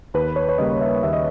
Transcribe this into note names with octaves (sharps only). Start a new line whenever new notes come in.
D#2 B4
C#5
C#5
C#3 G3 A#3 D#5
E5
D#2 E5
D#5